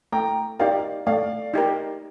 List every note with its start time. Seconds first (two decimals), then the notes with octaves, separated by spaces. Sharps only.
0.12 A3 G5 A#5
0.59 D#4 G4 A#4 D5 F5
1.06 A3 D5 F5
1.54 D#4 G4 A#4